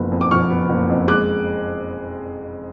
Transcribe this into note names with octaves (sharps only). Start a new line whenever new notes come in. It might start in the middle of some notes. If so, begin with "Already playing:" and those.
Already playing: F#1 F3 B3
F2
D6
F3 C#6 F6
B3
F#1
F2
G#3 D6 F#6